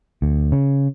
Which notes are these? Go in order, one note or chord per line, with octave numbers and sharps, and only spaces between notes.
D2
C#3